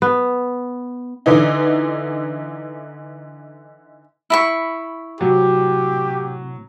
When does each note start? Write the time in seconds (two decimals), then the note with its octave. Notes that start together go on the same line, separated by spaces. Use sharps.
0.02 B3
1.26 D3 E3 D#4
4.30 E4 B5 C#6
5.21 A2 C3 F#3 G4